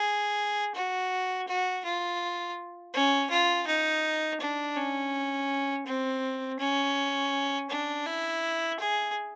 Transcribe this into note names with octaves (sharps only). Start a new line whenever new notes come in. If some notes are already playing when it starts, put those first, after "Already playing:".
Already playing: G#4
F#4
F#4
F4
C#4
F4
D#4
D4
C#4
C4
C#4
D4
E4
G#4